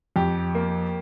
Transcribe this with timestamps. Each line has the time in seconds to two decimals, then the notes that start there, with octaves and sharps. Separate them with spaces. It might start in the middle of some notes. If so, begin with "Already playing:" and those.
0.16 F2 G4
0.55 A#3